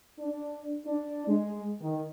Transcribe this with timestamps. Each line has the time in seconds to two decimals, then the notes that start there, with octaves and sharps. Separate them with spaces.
0.19 D4
0.86 D4
1.28 G#3
1.81 D#3